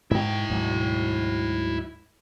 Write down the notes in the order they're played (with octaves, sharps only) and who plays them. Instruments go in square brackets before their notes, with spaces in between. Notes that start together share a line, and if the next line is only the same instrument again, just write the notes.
[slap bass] G#2 [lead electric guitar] E4 G5
[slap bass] D2 G#2 F#3